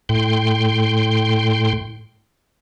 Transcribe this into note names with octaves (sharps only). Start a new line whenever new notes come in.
A2 G5 C6